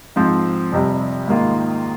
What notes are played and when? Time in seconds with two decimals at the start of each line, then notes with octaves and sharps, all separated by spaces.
0.16 G#2 F3 C4
0.72 F2 C3 G3
1.28 G#2 D#3 A#3 F4